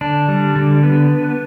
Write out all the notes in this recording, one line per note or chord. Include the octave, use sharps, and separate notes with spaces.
D3 D4
G3
D3
B3